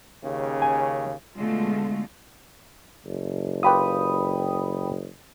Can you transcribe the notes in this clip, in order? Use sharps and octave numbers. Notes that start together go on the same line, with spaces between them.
D#2 C#3
G#5
B2 D3 G#3 A3 F4
F#1
F4 G4 B4 G5 B5 D#6